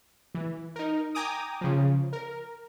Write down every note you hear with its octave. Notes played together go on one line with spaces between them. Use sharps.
E3
D#4 A#4
G5 G#5 A#5 D6 D#6
C#3 F3
A#4